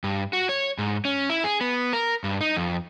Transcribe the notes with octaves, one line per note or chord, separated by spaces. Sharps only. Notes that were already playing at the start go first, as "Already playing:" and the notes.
G2
F#4
C#5
G#2
C#4
E4
G#4
B3
A#4
G2
D#4
F2